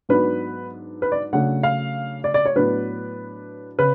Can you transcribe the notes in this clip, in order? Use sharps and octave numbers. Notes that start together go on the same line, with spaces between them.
G#2 F#3 B3 D4 B4
B4
D5
C#3 F#3 A3 D4 F#5
F5
D5
D5
C#5
A2 F#3 B3 D4 B4
C#3 B4